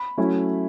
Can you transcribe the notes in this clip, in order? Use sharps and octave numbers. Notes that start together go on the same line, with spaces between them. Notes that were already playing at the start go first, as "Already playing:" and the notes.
Already playing: B5
F#3 A3 C#4 E4